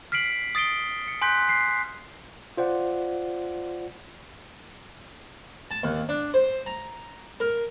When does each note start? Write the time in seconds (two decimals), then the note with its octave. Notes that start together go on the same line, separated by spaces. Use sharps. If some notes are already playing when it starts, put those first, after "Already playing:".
0.12 F6 B6 C7 D7 F#7
0.55 D#6 A6 C7 D7 G7
1.08 C#7
1.22 G#5 C6 F#6 G6 B6
1.49 C7
2.57 F4 C5 D5 F#5
5.71 A5
5.83 D#2
6.09 D4
6.34 C5
6.66 A#5
7.40 A#4